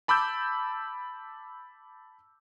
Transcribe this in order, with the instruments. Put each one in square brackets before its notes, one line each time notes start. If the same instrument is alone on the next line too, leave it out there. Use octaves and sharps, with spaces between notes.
[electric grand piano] A5 B5 D6 E6 G6